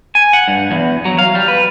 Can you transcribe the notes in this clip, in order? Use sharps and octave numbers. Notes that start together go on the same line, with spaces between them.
G#5
F#5
G2
E2
F#3
F5
G3
B4